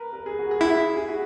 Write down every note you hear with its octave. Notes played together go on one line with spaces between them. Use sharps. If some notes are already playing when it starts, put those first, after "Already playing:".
Already playing: A#4 B4
A#4
G#4
F#4
G#4
E4
G#4
F#4